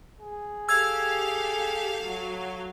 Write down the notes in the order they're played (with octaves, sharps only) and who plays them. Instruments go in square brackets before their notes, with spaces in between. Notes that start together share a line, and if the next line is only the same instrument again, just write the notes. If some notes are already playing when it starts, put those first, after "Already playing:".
[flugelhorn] G#4
[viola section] G4 [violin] A4 F5 [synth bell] E6 G#6
[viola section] F#3